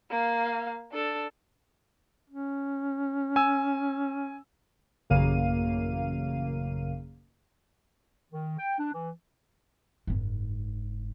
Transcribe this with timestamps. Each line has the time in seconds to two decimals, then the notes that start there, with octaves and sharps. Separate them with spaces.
0.11 A#3 F5
0.92 D4 A4
2.30 C#4
3.36 G#5 E6
5.10 A1 F#2 C#3 A#3 F5 D#7
8.32 D#3
8.58 G5
8.79 D4
8.94 E3
10.07 F#1 G#2